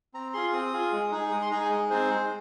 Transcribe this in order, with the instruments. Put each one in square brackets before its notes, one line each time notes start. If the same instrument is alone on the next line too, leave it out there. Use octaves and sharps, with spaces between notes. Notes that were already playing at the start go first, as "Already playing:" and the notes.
[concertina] C4 A#5
F4 G#4 C6
C4 D#6
F4 G#4
G#3
D#4 G#4
G#3 D#6
C6
D#4 G#4 A#5
G#5
G#3 D#5
C4 D#4 G#4 C5
G#3